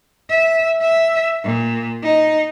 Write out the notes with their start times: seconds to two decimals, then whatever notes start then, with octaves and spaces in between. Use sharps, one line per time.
0.30 E5
0.81 E5
1.44 A#2
2.03 D#4